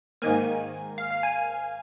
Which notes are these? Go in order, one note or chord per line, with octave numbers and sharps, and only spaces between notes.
G#2 D#3 A#3 G#5
F5
F5
G#5